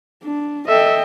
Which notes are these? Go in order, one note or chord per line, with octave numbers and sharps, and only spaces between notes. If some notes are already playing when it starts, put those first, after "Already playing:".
D4
A4 D#5 E5 G5